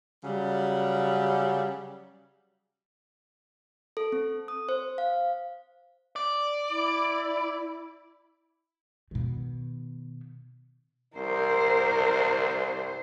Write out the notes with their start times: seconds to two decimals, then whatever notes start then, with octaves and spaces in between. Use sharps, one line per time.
0.24 C#3 F#3 G3
3.97 A4
4.12 C4
4.48 D#6
4.69 C5
4.98 F5
6.16 D5
6.70 E4
9.11 B2 D#3
11.17 C2 A#4 C5